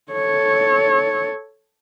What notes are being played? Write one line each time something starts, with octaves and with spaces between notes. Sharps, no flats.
A4 C#5